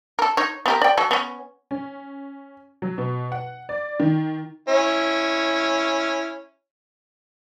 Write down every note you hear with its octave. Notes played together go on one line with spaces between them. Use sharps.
A4 A#4
D#4 C#5
B3 G4 A#4
D5 G5
F#3 A4
B3 C#4
C#4
F#3
B2
F#5
D5
D#3
C#4 E4